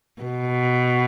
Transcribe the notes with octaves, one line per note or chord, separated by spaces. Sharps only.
B2